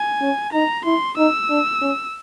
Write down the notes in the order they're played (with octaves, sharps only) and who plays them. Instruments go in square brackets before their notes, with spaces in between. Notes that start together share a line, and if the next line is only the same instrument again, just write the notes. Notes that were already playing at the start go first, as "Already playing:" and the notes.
Already playing: [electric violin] G#5
[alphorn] C#4
[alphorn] D#4 [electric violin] A#5
[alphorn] E4 [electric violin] C6
[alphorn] D#4 [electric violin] E6
[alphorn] D4
C#4